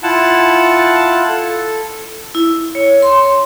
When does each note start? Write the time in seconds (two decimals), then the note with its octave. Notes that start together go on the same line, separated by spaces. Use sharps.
0.03 E4 F4 F#5 A5
1.29 A4
2.35 E4
2.75 C#5
3.02 C6